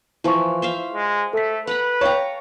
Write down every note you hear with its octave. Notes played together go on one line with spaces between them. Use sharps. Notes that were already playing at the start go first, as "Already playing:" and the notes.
E3 F3 E4 C#6
C5 E5 F5
G#3
A3 A4 B6
B4 F#5 A#5 B5
C#5 F5 G5 A5 A#5